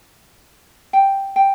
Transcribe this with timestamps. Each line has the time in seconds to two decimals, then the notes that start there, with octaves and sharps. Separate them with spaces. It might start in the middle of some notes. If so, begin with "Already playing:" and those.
0.93 G5
1.36 G5